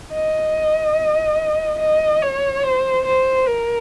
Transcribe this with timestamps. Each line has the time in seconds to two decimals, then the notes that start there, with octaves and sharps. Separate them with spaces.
0.13 D#5
1.80 D#5
2.22 C#5
2.64 C5
3.06 C5
3.47 A#4